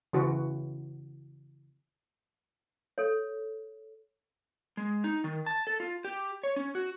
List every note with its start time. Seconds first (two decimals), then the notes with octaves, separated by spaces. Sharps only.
0.13 C#3 E3 F#4
2.98 A4 C#5
4.77 G#3
5.04 D#4
5.24 D#3
5.46 A5
5.67 A4
5.80 F4
6.05 G4
6.43 C#5
6.56 C#4
6.75 F#4